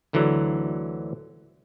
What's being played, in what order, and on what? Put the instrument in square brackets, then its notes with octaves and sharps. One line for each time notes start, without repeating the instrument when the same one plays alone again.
[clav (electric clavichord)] D2 D3 E3 F#3 A#5